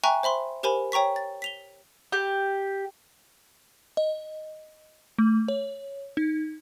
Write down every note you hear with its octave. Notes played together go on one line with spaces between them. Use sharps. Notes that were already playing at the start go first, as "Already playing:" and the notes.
E5 G5 G#5 A#5 C#6 F#6
C5 E5 B5 C6
G4 A#4 C5 G#5 B5
C#5 G5 A#5 C#6 B6
A6
B6 F7 G7
G4
D#5
A3
C#5
D#4